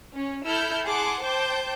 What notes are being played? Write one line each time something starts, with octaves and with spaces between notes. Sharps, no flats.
C#4
E4 A4 E6 F6 G6
G#4 F#5 A5 C6 D6
C5 G5 A5 D6 G6